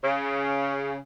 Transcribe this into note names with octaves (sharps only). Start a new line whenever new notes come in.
C#3